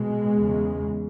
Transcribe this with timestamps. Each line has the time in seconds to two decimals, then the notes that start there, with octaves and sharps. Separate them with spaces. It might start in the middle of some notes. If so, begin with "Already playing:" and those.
Already playing: B2 G#3
0.36 E2 C#3